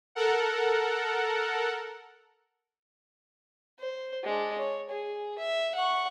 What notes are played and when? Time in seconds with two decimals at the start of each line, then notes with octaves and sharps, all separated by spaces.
0.15 A4 A#4 F#5
3.79 C5
4.24 G#3 D4
4.58 C#5
4.90 G#4
5.38 E5
5.75 F#5 C#6